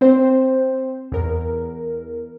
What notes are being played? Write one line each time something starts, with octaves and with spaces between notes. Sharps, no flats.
C4 C5
E2 A#4